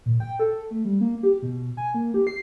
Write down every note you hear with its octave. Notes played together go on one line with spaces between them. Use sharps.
A#2
G5
A4
A3
G3
A#3
G4
B2
G#5
A#3
G4
C7